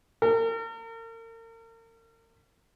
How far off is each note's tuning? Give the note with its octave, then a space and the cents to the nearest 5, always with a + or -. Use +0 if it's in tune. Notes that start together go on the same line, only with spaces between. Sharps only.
A#4 -40